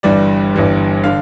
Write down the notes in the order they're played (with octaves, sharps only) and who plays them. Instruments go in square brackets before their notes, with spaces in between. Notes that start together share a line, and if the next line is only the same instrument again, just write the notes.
[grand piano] G1 G2 E3 G3 D5
G1 G2 E3 G3
D3 F5